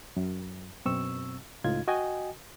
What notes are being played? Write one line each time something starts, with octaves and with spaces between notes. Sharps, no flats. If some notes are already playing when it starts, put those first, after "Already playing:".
F#2
F#2 B2 C4 C#6 E6
C#2 A2 D#4 F4 G#6
F#4 D#5 G5 G#5